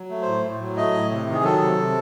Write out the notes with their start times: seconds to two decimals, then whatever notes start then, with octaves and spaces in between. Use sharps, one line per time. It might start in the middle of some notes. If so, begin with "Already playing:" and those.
Already playing: F#3
0.10 A3
0.22 A2 C5
0.44 A2
0.60 F#3
0.77 A3 D#5
0.94 A2
1.11 C3
1.27 D#3
1.35 G#4
1.44 F#3 A4
1.61 C3
1.78 C3